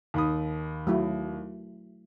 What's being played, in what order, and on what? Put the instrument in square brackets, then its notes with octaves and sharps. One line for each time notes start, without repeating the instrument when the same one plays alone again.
[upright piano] D#2 B5 D#6
[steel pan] F#3 A3 E4